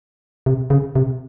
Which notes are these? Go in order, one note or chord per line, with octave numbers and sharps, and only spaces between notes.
C3
C#3
C3